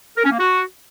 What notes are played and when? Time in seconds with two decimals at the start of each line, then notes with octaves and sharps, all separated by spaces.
0.17 A#4
0.24 C#4
0.32 A#3
0.39 F#4